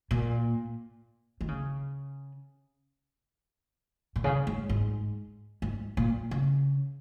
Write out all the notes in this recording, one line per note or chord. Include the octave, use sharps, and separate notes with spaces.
A#2
D#3
C#3
A#2
C#3
G#2
G#2
G#2
A#2
C#3